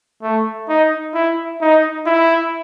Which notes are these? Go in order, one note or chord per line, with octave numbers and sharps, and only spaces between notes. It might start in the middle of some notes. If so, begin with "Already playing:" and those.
A3
D#4
E4
D#4
E4